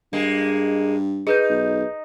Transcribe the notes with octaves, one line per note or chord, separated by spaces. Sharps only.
G2 G#3 A#3
D#4 G#4 B4 G6
B1